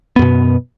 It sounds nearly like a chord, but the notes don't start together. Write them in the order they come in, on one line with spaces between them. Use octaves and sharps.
B3 F#2 B2